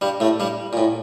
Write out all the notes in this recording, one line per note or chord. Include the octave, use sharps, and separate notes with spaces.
G2 G3
A2 A3
G2 G3
A#2
A2